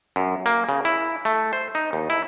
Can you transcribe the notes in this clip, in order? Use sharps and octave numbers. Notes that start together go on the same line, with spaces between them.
F#2
A#3
C#3
E4
A3
C5
D#4
D#2
E4